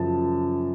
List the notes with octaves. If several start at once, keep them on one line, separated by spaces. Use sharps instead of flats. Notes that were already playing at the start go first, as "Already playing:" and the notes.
Already playing: F#2 C#3 F3 A5